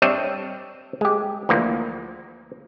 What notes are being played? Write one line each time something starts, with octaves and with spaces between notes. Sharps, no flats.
G3 C4 D4 C#5 D#5 E5
G#3 G4
D2 E3 F3 A#3